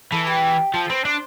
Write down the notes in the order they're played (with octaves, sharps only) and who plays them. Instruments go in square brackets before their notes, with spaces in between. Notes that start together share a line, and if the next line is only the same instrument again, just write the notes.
[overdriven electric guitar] E3 [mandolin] A4
[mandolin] G4
[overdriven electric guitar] F3 [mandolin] A4
[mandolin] A4
[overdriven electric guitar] C4 [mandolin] B4
[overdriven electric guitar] D4 [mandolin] C5